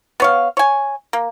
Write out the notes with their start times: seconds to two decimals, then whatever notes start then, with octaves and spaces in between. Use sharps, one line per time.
0.20 B3 C#5 F5
0.57 C#5 G#5
1.13 A#3